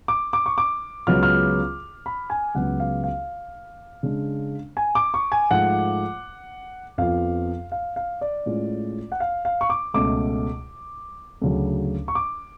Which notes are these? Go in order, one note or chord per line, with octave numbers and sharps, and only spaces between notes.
D6
D6
C#6
D6
C#2 C#3 F#3 B3 F4 F6
F6
B5
G#5
C#2 C#3 F#3 B3 F#5
F5
F5
C#3 G#3 D4
G#5
D6
C#6
G#5
G#2 F3 A3 F#5
F2 F3 B3 F4 F5
F5
F5
D5
A2 G#3 C#4 F4
F#5
F5
F5
C#6
D6
C#2 B2 A3 C#4 D6
D2 C#3 F#3
C#6
D6